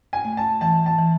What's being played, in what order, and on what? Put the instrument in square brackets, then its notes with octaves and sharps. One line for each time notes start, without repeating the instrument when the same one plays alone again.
[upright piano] G#5
[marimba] A3
[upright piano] A5
[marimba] E3 [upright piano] A5
[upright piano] A5
[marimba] E3